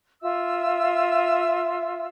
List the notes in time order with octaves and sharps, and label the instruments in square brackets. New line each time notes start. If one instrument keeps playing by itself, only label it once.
[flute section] F4 E5 E6